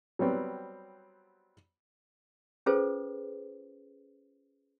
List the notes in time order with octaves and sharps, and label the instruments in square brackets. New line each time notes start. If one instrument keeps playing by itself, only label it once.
[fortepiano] F#3 G3 B3 C4
[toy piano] C#4 F4 G#4 A4 B4 C5